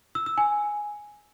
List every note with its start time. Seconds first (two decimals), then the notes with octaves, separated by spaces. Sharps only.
0.15 E6
0.26 E6
0.38 G#5